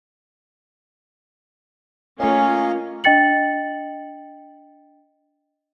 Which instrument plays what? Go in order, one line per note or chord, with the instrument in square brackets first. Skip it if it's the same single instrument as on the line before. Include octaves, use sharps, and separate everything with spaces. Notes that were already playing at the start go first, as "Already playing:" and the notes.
[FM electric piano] A3 C#5 [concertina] A#3 D#5 F5 [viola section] C#4 F4 [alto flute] G#5
[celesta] D4 D#5 G5 A6 C#7 F#7